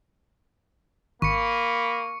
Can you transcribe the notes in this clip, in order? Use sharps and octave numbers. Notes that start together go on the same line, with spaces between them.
G#1 A#3 B5 C#6 C#7